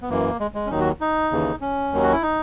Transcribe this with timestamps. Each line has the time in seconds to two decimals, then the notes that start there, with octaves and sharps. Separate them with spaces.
0.02 B3
0.09 F#2 E3 A#3
0.40 G#3
0.55 G#3
0.66 C#4
0.70 D#2 D#3 F#3 D#4
0.80 F#4
1.01 D#4
1.31 D#2 C#3 E3
1.61 C#4
1.92 D#2 D#3 F#3
2.03 F#4
2.13 E4
2.22 D#4